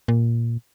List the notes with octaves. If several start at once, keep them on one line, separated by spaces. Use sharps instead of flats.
A#2